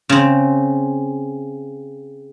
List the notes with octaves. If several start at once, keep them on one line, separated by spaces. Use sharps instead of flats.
C#3 C4